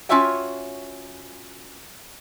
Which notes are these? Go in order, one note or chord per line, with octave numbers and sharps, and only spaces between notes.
C#4 F4 F#4 C#5 E5 G5